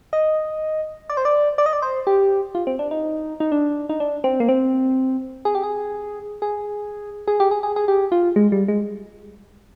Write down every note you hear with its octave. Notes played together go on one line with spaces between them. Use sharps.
D#5
D5
C5
D5
D5
D#5
D5
C5
G4
F4
C4
D4
D#4
D#4
D4
D#4
D4
C4
A#3
C4
G#4
G4
G#4
G#4
G#4
G4
G#4
G#4
G#4
G4
F4
G#3
G3
G#3